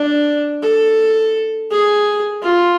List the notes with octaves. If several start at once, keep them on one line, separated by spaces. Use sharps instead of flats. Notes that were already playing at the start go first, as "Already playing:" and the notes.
Already playing: D4
A4
G#4
F4